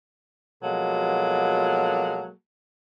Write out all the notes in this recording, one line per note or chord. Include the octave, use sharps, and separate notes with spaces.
B2 F3 F#3 G#3 A#3 A4